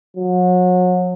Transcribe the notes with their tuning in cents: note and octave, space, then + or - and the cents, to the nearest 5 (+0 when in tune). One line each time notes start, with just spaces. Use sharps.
F#3 -35